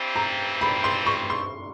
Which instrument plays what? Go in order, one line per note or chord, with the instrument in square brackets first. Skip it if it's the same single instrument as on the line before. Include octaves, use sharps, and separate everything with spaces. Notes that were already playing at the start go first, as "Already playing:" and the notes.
Already playing: [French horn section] G2 E3 G3 C4
[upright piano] A#5
B5
C6
C#6
C6